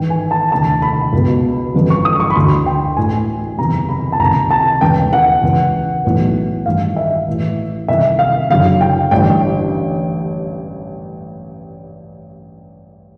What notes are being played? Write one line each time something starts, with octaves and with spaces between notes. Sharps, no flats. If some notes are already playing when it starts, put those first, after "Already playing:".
Already playing: G#1 G#2 E3 G5
G#5
A5
F1 D#2 D3 A5
B5
C#2 B2
G1 F2 C#3 E3
C#6
D#6
C#6
B5
D2 D3 C6
G5
A1 A2 E3 G#5
F#1 E2 C3 D#3 A#5
B5
A5
C#2 C3 D#3 A#5
A5
E1 D#2 C#3 E3 G5
F#5
C#2 C#3 E3
B1 A2 E3
A1 G2 D#3 F5
E5
A1 A2 E3
C2 C3 D#3 E5
F5
F#1 F#2 D3 F5
G5
A1 G2 D3 G5